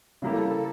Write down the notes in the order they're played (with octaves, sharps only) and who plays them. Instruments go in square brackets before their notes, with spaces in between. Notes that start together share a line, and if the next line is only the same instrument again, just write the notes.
[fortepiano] C#3 G3 A#3 E4 G4 [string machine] A4